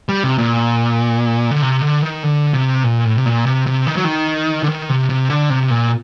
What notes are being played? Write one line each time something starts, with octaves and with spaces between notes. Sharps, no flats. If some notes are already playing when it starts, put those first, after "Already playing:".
G3
C3
A#2
D3
C3
D3
D#3
D3
C3
A#2
A2
C3
A#2
C3
C3
D#3
F#3
D#3
D3
D#3
C3
C3
D3
C3
A#2